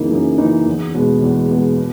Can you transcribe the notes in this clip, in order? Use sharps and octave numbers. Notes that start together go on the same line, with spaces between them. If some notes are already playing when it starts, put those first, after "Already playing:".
Already playing: F#2 C#3 E3 A#3 D#4
F#2
C#3 E3 A#3 D#4
E2
B2 G#3 B3
E2
B2 G#3 B3
B2